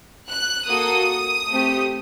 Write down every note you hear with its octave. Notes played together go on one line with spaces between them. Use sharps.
F#6
A#3 F#4 A4 D#6
A3 C4 G4